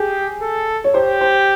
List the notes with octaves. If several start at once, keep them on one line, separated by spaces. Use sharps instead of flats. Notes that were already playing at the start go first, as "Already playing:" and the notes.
Already playing: G4 G#4
A4
C#5
G4 C5
C5